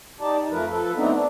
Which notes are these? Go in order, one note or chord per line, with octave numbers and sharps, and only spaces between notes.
D#4 G4 D5 A5
D#4
F2 F3 A3 A#4 B4
F3 A4 B4
A3 B3 C4 D4 D#4
D4